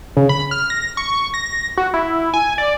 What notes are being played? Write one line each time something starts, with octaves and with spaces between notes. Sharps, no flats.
C#3
B5
F6
A#6
C#6
A#6
F#4
E4
G#5
D5